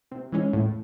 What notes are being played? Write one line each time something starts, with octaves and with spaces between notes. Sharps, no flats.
C3
E3 G#3 C#4
A2